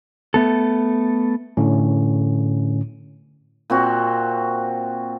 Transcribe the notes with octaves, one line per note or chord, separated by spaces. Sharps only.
A3 B3 A4
A2 D3 C#4
A#2 C4 F#4